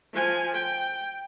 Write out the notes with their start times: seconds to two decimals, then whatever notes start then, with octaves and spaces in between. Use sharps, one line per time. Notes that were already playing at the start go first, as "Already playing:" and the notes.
0.13 F3 G#5
0.54 G5